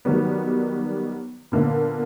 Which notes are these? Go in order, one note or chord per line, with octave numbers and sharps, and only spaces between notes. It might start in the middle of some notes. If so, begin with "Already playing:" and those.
D#3 F#3 G3 B3
A#2 D3 A#3 B3